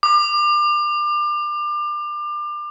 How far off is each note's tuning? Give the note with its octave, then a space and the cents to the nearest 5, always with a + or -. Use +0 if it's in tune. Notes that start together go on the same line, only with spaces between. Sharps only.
D6 +30